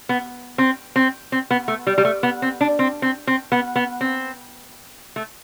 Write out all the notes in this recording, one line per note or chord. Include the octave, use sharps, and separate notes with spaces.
B3
C4
C4
C4
B3
A3
G3
G3
A3
B3
C4
D4
C4
C4
C4
B3
B3
C4
A3